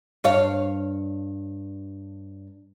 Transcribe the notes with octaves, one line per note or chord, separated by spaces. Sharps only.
G2 C#5 F5